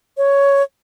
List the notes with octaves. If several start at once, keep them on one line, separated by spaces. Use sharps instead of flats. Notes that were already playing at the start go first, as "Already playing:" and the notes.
C#5